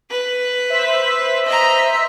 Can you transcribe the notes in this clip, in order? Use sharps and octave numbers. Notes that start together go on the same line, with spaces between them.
B4
C5 E5 B6
D#5 A#5